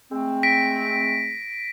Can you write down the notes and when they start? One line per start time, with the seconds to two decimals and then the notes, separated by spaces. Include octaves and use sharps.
0.12 G#3 A3 C4
0.43 A#6 B6 D7